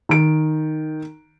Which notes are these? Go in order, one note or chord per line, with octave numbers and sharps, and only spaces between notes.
D#3 D7